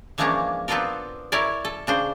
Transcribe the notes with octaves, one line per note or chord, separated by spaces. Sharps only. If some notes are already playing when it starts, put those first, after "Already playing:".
E3 F3 G#3 A#3 C#4 D4
B3 C4 D4 F4 A4 A#4
E4 A#4 C#5 D5
A4
C#3 D4 C5